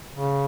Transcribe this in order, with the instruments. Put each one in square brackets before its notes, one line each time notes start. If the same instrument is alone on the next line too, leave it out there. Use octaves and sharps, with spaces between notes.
[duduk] C#3